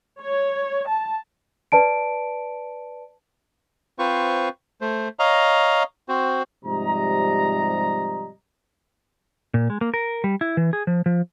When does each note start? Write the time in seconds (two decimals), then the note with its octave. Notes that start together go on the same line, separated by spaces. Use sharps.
0.20 C#5
0.87 A5
1.72 B4 D5 A5 D7
3.99 C4 F4 B4 C5 C#6
4.81 A3 C5
5.19 C#5 D#5 F5 A#5
6.09 C4 F#4 C5
6.65 G#2 C3 F3 G3 D#5 A#5
9.54 A#2
9.70 G#3
9.81 A#3
9.94 A#4
10.24 G3
10.41 E4
10.57 E3
10.73 G#4
10.87 F3
11.06 F3